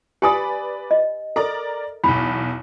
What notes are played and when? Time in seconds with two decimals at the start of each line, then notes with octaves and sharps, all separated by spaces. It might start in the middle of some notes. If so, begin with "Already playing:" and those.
0.22 G4 B4 D5 G#5 B5 D#6
0.91 D#5
1.36 A4 A#4 D5 A#5
2.04 B1 E2 B5